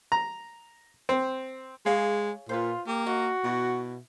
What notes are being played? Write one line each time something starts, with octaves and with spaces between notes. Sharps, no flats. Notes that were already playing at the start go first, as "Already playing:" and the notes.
A#5
C4
G#3 G#4 C#5 F5
A#2 F4 B4 C5
A#3 G4
F#4 D#5
B2 E4